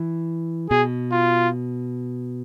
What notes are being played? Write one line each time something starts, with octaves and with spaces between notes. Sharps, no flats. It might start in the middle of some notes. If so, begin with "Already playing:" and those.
Already playing: E3
B2 G#4
F4